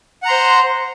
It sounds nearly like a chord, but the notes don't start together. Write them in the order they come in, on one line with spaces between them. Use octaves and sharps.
F#5 A#5 C6 C5